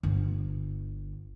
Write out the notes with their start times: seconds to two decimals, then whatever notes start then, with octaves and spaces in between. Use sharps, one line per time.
0.03 G1